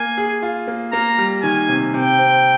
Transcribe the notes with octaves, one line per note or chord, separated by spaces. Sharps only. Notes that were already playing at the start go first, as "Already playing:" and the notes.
Already playing: A#3 G#5
G#4
F4
A#3
A#3 A#5
G3
D#3 G#5
C3
C3 G5
C4